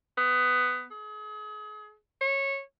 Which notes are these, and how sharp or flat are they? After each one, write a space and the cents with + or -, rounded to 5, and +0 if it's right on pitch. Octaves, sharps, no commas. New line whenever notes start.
B3 +15
G#4 +35
C#5 -15